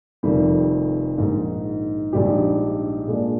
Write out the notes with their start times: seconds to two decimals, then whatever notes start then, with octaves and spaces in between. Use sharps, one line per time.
0.23 F1 F2 D#3 G3
1.18 A#1 G#2 D#3
2.13 A#1 G#2 G3 D4 G4
3.07 A#2 G#3 D4